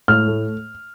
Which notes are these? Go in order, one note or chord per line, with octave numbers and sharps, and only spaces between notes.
A2 F6
A3